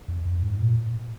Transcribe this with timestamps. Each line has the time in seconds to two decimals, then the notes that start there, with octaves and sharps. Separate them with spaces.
0.08 F2
0.25 F2
0.43 G#2
0.61 A#2